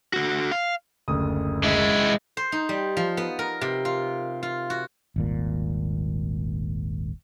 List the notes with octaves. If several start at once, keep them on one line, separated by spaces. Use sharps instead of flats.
D3 F#4
F5
F#1 D2 D#6
G#3 E4
C5
D#4
G3
F3
B3
A#4
C3
F4
F4
F#4
D#1 G#1 A#2